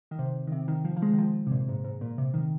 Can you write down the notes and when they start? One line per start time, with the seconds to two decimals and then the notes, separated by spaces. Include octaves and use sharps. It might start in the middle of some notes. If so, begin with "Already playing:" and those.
0.11 D#3
0.19 C3
0.47 D#3
0.52 C3
0.68 D#3
0.85 F3
0.97 F3
1.02 G#3
1.13 D#3
1.18 F3
1.47 C3
1.52 A#2
1.68 G#2
1.84 G#2
2.01 A#2
2.18 C3
2.34 D#3